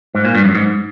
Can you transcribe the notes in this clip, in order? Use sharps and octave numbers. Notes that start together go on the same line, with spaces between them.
G#2
A#2
G2
F#2
G#2